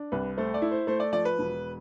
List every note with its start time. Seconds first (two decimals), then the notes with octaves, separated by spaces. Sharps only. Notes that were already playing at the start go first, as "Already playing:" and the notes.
Already playing: D4
0.12 C2 B4
0.37 A3 C5
0.54 D5
0.62 E4
0.71 C5
0.87 A3 C5
1.00 D5
1.13 F3 D5
1.25 B4
1.39 E1